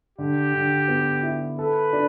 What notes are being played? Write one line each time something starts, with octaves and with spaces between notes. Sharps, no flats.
D3 G4
D3
B3
E4
A4 B4
D4